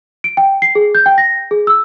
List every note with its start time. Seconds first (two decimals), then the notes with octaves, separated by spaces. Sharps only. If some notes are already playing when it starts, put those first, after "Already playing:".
0.24 D7
0.37 G5
0.62 C7
0.75 G#4
0.95 G6
1.06 G5
1.18 A#6
1.51 G#4
1.67 E6